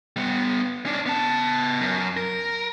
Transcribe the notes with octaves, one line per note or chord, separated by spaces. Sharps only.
G3 B3
C#4 D4
B3 A5
F#2
A#4